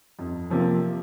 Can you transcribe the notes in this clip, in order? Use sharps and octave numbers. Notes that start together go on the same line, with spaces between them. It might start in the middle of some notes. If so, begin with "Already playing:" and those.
F2
C3 F3 A#3